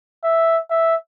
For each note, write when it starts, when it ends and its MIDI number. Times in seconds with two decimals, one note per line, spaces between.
0.24 0.59 76
0.70 0.95 76